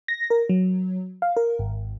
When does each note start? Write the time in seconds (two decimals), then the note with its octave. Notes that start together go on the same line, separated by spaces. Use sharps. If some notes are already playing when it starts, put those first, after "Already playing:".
0.08 A#6
0.30 A#4
0.49 F#3
1.22 F5
1.37 A#4
1.59 G#1